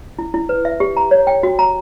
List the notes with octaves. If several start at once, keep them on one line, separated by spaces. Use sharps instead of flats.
E4
E4
B4
E5
G4
A#5
C#5
G5
F#4
A#5